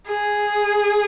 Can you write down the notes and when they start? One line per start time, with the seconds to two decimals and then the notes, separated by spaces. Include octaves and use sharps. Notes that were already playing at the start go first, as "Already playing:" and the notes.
0.09 G#4